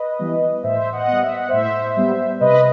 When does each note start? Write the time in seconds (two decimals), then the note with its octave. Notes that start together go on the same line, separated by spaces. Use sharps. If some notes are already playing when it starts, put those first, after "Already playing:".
Already playing: B4 D#5
0.19 E3 G3 B3
0.63 A2 C5 E5
0.92 D#5 F#5
1.07 G3 B3
1.22 E5
1.35 F#5
1.49 A2 C5 E5
1.97 G3 B3
2.40 C3 B4 D#5